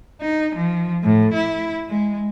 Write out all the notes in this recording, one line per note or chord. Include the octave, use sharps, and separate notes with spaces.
D#4
F3
A2
E4
G#3